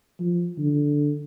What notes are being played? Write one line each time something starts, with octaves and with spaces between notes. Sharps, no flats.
F3
D3